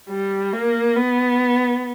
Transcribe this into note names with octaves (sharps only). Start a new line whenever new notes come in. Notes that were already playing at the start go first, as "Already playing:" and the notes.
G3
A#3
B3